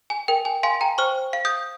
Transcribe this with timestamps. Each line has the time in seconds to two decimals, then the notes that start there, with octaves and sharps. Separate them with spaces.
0.10 G#5
0.28 A#4 G5
0.45 G#5
0.63 F5 G#5 C6
0.81 G5 A#5
0.98 C5 C#6 F6
1.33 F5
1.45 D#6 G6